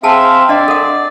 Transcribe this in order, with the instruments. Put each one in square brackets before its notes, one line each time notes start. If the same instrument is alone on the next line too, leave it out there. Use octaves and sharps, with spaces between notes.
[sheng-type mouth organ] C4 E5 F5 [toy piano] G#4 G#5 A5
[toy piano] D4 D#5 [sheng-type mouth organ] D5
[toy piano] A4 A#4 F#5